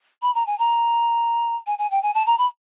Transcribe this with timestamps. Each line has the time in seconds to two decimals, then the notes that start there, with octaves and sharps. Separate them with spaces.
0.22 B5
0.35 A#5
0.46 G#5
0.59 A#5
1.67 G#5
1.78 G#5
1.91 G5
2.02 G#5
2.14 A5
2.26 A#5
2.38 B5